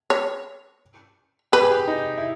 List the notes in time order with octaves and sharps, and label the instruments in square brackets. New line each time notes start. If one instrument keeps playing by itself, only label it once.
[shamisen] C#5
[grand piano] G4 [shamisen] B4
[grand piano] G#4
G4
D#4
E4